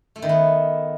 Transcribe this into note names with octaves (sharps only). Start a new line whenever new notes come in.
A3
D#3
B3